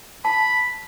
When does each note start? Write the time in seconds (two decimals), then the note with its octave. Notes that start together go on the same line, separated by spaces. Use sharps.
0.25 A5 B5